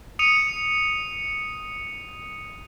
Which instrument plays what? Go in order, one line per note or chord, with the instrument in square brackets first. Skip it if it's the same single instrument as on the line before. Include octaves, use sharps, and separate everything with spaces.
[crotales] D#6 C#7 D#7 F7